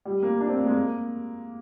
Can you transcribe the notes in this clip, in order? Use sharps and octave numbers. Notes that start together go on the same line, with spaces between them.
G3
A#3
D4
C4
A#3
G#3
A#3